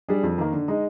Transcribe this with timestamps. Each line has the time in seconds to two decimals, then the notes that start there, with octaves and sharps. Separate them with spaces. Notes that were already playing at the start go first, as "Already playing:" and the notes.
0.08 G3 D4 G#4
0.23 F2
0.38 D#3 A#3
0.53 D3
0.68 G#3 D#4